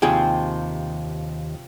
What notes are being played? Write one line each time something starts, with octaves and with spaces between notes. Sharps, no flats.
D#2 C3 F3 C4 G#4 G5